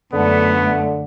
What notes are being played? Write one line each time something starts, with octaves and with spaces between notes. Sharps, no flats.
F#2 D3 A3 B3